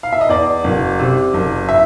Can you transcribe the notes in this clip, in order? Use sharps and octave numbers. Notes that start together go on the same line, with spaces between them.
F5
E5
D#5
E2 D5
F#1
C3
F#1
E5